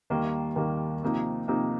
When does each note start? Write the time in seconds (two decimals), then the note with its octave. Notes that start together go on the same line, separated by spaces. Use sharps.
0.10 D#2 D#3 G3 A#3
0.56 D#2 D#3 G3 A#3
1.03 C3 F3 A#3 D#4
1.48 C3 F3 A#3 D#4